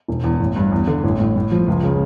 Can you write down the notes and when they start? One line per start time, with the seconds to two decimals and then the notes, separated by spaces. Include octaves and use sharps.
0.08 E1
0.24 E2
0.40 A1
0.56 G2
0.72 E2
0.87 D3
1.04 A1
1.20 A2
1.36 A2
1.52 F3
1.68 C#2
1.83 C#3